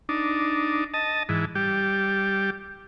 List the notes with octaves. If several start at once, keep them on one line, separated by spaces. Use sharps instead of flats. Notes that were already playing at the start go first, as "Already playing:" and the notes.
D4 D#4
D#5 A5
G#2 E3
G3 G4